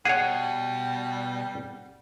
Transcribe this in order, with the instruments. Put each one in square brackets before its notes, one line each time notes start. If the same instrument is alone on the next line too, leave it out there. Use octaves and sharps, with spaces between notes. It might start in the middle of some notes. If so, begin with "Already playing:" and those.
[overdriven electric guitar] B2 [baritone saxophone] G3 [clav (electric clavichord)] G#4 C#5 [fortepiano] F#5